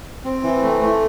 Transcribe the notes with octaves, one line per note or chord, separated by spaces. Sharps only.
C4
E3
A3
A3